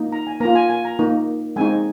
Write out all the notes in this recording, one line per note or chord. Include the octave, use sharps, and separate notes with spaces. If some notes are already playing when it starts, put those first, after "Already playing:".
Already playing: A#3 D#4
A#5
G#5
A#3 F4 A#5
G#5
G#5
A#5
A#3 D#4
G#3 C4 D#4 G#5